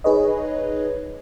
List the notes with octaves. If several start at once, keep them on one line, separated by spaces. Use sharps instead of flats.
D#4 G#4 B4 C#5 D#5